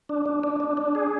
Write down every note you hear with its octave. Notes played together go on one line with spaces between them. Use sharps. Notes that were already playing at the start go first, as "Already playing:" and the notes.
D4
D4
D4
D4
D4
G#4